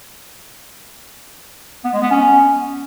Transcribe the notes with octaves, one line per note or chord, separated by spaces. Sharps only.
B3
G#3
B3
C#4